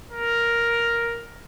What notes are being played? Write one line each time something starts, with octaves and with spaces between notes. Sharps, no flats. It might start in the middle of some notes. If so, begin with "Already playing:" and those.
A#4